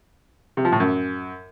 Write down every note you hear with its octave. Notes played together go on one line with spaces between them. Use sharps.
C3
F3
A2
F#2